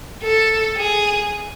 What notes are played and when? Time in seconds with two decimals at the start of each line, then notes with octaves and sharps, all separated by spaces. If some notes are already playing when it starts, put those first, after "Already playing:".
0.23 A4
0.78 G#4